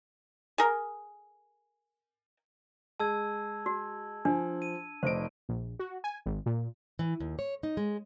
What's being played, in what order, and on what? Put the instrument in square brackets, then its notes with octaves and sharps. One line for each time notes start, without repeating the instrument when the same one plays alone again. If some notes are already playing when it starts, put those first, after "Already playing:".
[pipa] G#4 A#4
[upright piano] G#3 [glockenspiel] A5 E6 G#6
[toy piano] F#4
[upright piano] F3 [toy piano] D4
[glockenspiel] D#7
[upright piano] F1 D#5 D7 [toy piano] C5
[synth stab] A#1
F#4
G#5
G#1
A#2
[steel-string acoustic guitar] E3
D#2
C#5
D#4
G#3